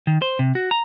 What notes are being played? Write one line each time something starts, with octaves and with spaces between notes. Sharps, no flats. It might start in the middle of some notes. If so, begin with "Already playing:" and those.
D#3
C5
C3
F#4
A#5